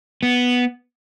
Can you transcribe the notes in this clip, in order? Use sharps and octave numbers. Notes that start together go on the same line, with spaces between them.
B3